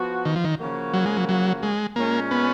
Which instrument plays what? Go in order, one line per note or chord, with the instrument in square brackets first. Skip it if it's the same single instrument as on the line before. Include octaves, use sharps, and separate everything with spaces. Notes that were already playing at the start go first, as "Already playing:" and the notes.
Already playing: [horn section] F3 B3 F#4
[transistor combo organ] D#3
F3
D#3
[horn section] C#3 F3 A#3 C#4 F#4
[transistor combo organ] F#3
G#3
F#3
F#3
G#3
[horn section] A#2 G#3 C#4 [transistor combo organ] A#3
[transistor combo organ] B3